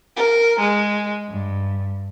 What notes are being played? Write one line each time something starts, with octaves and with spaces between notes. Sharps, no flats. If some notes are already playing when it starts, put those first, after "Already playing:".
A#4
G#3
G2